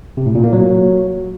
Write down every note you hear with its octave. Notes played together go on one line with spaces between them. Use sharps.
C3
A2
A#2
A#3
F#3